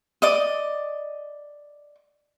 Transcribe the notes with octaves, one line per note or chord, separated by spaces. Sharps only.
D5 D#5 D#6